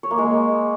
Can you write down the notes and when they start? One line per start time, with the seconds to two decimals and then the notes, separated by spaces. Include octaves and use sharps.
0.03 C#5
0.11 A#3
0.18 G#3